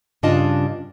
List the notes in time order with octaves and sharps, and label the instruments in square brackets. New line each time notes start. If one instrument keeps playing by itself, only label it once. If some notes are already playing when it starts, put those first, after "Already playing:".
[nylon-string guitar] G2 C#3 D4 F4 D#5 A5